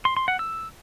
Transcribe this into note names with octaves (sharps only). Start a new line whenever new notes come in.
C6
C6
F#5
E6